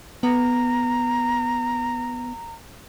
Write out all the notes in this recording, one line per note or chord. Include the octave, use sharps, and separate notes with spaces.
B3 A#5